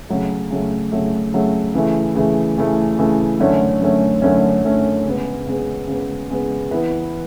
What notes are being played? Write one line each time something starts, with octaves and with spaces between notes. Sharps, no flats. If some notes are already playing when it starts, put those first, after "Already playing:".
C#3 F#3 A3
C#3 F#3 A3
C#3 F#3 A3
C#3 F#3 A3
C#3 E3 A3
C#3 E3 A3
C#3 E3 A3
C#3 E3 A3
F#2 D3 A3 C#4
F#2 D3 A3 C#4
F#2 D3 A3 C#4
F#2 D3 A3 C#4
C#3 G#3 B3
C#3 G#3 B3
C#3 G#3 B3
C#3 G#3 B3
E3 B3 E4 B4